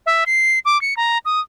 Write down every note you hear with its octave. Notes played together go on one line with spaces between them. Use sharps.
E5
C7
D6
C#7
A#5
D#6